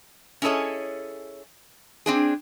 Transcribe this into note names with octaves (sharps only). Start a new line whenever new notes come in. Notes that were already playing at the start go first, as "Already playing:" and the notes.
C#4 E4 G#4 A4 C#5 D#5
C4 D4 G#4